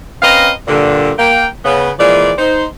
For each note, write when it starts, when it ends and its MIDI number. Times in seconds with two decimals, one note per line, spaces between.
0.22 0.50 60
0.22 0.50 61
0.22 0.50 71
0.22 0.50 75
0.22 0.50 77
0.22 0.50 82
0.67 1.12 43
0.67 1.12 46
0.67 1.12 50
1.19 1.47 58
1.19 1.47 79
1.65 1.90 49
1.65 1.90 59
1.99 2.32 46
1.99 2.32 52
1.99 2.32 53
1.99 2.32 56
1.99 2.32 74
2.38 2.65 63
2.38 2.65 72